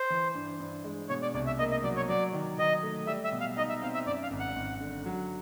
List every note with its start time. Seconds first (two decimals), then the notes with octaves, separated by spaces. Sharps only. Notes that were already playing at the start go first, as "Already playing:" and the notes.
Already playing: C5
0.10 E3
0.35 G2
0.60 G2
0.84 G#3
1.09 B2 C#5
1.22 D5
1.34 C2 D5
1.47 E5
1.59 A#3 D#5
1.71 D#5
1.83 F#3 D5
1.97 C#5
2.09 F#3 D5
2.33 D#3
2.58 D#3 D#5
2.83 A3
3.07 G3 E5
3.24 E5
3.32 B2
3.40 F5
3.57 D#4 D#5
3.69 E5
3.82 C4 F5
3.94 E5
4.06 F#2 D5
4.23 F5
4.31 G#1
4.40 F#5
4.56 G#1
4.81 D3
5.06 F#3